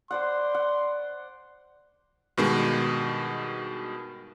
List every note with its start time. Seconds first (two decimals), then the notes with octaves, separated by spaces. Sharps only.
0.11 C5 D5 F#5 C6
0.54 F#5
2.37 G2 B2 D#3 G#3